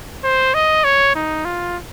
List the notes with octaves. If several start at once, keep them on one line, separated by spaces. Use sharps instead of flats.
C5
D#5
C#5
D#4
F4